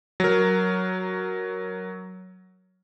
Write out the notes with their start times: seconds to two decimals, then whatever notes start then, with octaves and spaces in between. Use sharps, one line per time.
0.20 F#3 A#4